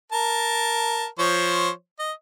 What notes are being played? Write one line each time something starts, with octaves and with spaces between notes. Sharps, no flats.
A#4 A5
F3 C5 C#5
D#5